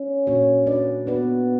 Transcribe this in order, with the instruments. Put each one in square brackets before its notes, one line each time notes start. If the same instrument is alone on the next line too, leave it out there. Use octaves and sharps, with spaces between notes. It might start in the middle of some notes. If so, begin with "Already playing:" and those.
Already playing: [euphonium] C#4
[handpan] A#2 A#3 D4 F#4 C#5
A#3 D4 F#4 B4 D5
[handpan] A#3 D4 F#4 B4 D5 [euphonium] B3